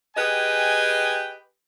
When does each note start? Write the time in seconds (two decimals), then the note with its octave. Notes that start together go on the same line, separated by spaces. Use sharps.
0.16 G4 G#4 B4 D#5 G5 G#5